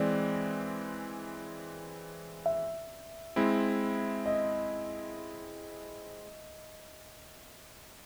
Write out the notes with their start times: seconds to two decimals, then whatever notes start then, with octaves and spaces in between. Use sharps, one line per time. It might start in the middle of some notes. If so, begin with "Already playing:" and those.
Already playing: E3 G#3 C4 D5
2.46 E5
3.36 G#3 C4 E4
4.26 D#5